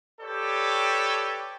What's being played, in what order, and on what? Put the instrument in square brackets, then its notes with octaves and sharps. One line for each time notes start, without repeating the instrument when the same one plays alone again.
[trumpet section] G4 A4 B4 C#5 D5 G5